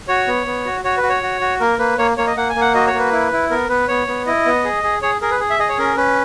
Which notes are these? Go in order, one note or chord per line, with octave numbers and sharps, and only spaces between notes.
F#4 C#5
B3
B3
F#4
F#4 C#5
B4
F#4
C#5
F#4
F#4
A#3 A#4
A#3 B4
A#3 C#5
A#3 C#5
D#5
A#3 F#5
G#5
A#3
F#5
F#4 D#5
C#5
A#3
B4
E4
E4
B3 A#4
B3 B4
B3 C#5
B3
E4 D#5
B3
G#4
G#4
G#4 C#5
G#4 A#4
B4
G#4
E5
G#4 D#5
C#5
C#4 A#4
C#4 B4